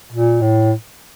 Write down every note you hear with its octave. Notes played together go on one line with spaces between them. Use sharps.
A#2
A2